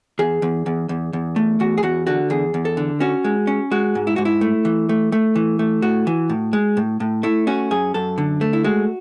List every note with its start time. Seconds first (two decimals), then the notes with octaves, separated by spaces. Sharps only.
0.19 E2 G#4
0.42 E2
0.66 E2
0.89 E2
1.13 E2
1.36 A3
1.60 E2 F#4
1.78 G#4
1.83 E2 F#4
2.07 D3 F#4
2.30 E2 G#4
2.54 E2
2.65 A4
2.77 D3
3.00 C#4 F#4
3.24 G#3
3.47 C#4
3.71 G#3 F#4
3.95 G#2
4.07 E4
4.16 G#2 F#4
4.25 E4
4.41 A3
4.65 E3
4.89 A3
5.12 A3
5.35 E3
5.59 A3
5.82 A2 F#4
6.07 E3
6.30 A2
6.53 G#3
6.77 A2
7.00 A2
7.23 A3 E4
7.47 C#4 F#4
7.71 F#2 G#4
7.94 F#2 A4
8.18 D3
8.41 A3
8.53 E4
8.64 G#3 F#4